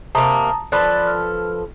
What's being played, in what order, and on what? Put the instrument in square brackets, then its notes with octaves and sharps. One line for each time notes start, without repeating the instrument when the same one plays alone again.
[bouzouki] C3 A#3 [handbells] A5 A#5 D#6
[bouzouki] F3 A4 B4 [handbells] D5 F#6
[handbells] F6